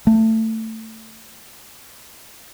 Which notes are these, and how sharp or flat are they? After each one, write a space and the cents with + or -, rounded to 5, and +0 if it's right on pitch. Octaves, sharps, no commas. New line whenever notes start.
A3 +20